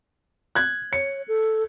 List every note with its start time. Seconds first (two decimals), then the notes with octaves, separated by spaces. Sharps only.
0.55 F#6 G#6
0.93 C#5 C#7
1.28 A4